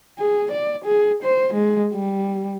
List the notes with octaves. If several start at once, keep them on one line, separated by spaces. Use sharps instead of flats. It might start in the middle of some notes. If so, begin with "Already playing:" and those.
G#4
D5
G#4
C5
G#3
G3